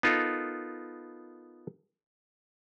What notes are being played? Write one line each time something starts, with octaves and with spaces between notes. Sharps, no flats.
B3 D#4 F4 A4 A#4